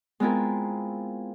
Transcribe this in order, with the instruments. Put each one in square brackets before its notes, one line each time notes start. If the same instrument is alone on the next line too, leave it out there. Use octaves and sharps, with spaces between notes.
[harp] G#3 B3 C4 E4 F4 A#4